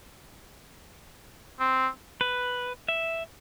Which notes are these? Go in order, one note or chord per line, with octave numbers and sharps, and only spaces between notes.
C4
B4
E5